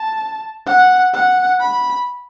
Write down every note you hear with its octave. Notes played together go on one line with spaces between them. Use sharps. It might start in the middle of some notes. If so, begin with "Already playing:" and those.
Already playing: A5
F#5
F#5
B5